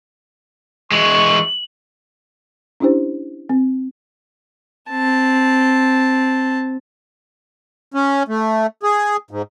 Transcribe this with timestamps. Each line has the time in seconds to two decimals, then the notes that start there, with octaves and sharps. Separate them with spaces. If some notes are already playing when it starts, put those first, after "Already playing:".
0.92 E3 G#3 C#6 F#7
2.80 C#4 D4 E4 G4 C5
3.49 C4
4.91 C4 A5
7.94 C#4
8.28 A3
8.83 G#4
9.31 G#2